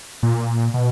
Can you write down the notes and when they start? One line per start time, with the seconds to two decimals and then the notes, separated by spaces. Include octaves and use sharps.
0.23 A#2
0.74 B2